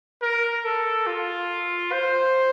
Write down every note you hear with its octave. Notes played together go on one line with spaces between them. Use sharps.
A#4
A4
F4
C5